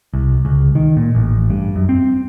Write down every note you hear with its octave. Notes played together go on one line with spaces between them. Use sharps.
C2
C#2
D#3
A#2
A1
G2
F#2
C4